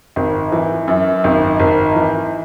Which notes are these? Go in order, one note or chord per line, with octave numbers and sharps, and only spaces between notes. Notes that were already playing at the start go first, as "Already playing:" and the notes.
G#1
E3
F#2
G#1
G#1
E3